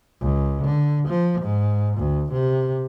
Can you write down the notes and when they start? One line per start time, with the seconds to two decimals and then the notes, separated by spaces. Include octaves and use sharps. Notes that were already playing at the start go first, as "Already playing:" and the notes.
0.21 C#2
0.65 D3
1.08 F3
1.41 G#2
1.97 D2
2.32 C3